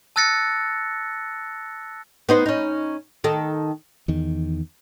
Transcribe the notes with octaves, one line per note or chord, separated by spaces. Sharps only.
A5 E6 F#6 A6 A#6 C#7
B3 D#4 C5
C#4 D#4
D#3 A4
E2 D#3